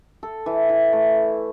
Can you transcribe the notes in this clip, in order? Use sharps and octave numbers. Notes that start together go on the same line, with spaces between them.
A4
E3
E4
A3